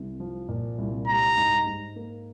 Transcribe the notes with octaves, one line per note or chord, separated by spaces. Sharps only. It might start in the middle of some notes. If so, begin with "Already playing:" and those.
Already playing: C2
F3
A#2
C2
G3 A#5
G#2
G#2
A#3